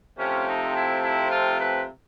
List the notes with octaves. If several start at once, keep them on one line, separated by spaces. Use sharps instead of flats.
C3 F3 A3 C4 C#4
D#4
E4
E4
F4
B4